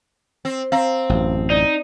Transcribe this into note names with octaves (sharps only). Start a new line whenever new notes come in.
C4
C4 F5 A#5
A1 F#2
D#4 D5